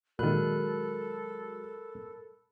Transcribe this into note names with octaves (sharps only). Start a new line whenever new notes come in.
A#2 D#3 F#3 G#3 A4 A#4 B5 F#6